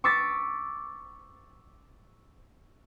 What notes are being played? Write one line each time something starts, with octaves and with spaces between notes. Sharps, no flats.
C#6 D6 E6 A6 B6